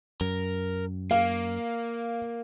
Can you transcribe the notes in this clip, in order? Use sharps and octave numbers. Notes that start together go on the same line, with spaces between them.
F#2 A#4
A#3 F5